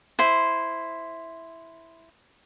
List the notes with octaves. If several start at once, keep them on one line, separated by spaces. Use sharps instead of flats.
E4 C5